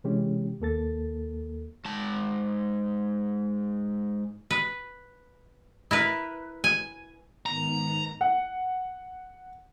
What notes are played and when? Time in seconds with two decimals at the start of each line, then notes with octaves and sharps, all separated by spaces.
0.04 C3 E3 G#3 C#4 G4
0.60 D#2 A#3 A4 A6
1.85 G#2 A5
4.51 B4
5.91 E4 A#4 B4
6.64 G#5
7.46 G#2 D#3 B3 A#5
8.21 F#5